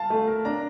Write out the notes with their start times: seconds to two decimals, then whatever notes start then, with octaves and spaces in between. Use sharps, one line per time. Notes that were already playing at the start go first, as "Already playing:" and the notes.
Already playing: F5 A5
0.10 A3
0.27 A#4
0.45 D4 A#5